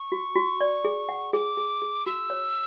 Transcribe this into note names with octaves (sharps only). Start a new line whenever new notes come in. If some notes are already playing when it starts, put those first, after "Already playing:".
Already playing: C#6
F#4
F#4
D5
G#4
F#5
G#4 D6
G#4
G#4
F#4 E6
C#5